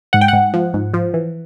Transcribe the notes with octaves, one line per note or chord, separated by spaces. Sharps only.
G#2 F#5
G5
G#2 F#5
F3
G#2
F3
E3